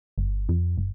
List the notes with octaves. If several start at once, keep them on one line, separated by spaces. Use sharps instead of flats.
G1
F2
G1